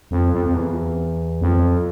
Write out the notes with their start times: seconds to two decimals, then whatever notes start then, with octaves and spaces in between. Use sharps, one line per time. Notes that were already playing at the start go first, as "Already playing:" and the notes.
0.11 F2
0.33 F2
0.45 F2
0.54 E2
1.41 F2